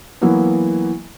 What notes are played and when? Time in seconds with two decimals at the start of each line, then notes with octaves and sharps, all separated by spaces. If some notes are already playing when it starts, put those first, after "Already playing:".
0.21 E3 F#3 A#3 B3 E4